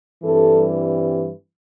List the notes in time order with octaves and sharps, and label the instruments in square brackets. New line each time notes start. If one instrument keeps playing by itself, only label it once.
[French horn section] G2 E3 G3 C4 A4